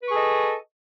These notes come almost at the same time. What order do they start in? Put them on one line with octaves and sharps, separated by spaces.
B4 C#6 G#4 A4 D#5